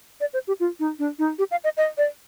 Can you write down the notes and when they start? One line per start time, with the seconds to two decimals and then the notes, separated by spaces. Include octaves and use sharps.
0.20 D5
0.33 C5
0.47 G4
0.60 F4
0.79 D#4
0.99 D4
1.19 D#4
1.38 G4
1.51 F5
1.64 D#5
1.77 D#5
1.98 D5